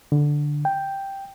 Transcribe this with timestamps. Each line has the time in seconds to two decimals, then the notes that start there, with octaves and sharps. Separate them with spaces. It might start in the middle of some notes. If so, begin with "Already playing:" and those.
0.12 D3
0.65 G5